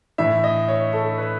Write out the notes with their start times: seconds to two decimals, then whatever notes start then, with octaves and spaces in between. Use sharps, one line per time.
0.18 A2 E3 E5
0.44 D#5
0.68 C#5
0.93 A4
1.18 B4